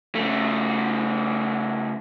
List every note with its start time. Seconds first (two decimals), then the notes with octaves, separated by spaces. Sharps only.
0.15 C#3 A3